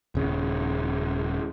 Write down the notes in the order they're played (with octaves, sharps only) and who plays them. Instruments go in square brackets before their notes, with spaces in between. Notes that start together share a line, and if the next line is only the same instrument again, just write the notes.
[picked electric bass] D#1 C#3